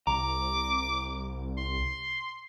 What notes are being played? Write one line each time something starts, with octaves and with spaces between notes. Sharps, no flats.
C2 A#5 D6
C6